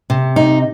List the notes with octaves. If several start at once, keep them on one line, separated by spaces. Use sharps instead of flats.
C3
D#4